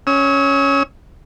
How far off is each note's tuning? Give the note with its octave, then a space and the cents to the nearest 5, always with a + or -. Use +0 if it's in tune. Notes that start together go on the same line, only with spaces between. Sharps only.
C#4 +0 E6 -45